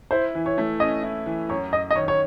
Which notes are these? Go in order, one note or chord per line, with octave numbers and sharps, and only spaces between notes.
E4 C5
E3
C#5
A3
C#4 D#5
E4
E3
F#2 C#5
F#2 D#5
D#5
D#3 C#5
C#5